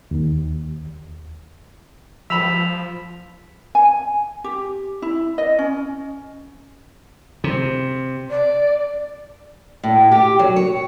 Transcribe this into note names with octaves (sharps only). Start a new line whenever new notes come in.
D#2
F3 B5 E6 B6 E7 F7
G#5
G4
E4
D#5
C#4
C3
D5
A2
G4
F#3
C#5